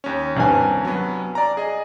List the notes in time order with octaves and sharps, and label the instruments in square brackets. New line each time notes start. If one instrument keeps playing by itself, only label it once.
[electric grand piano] D#2 C#4
[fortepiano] C2 G2 G#5
[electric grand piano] F#3 B3
D5 A#5
G#4 D#5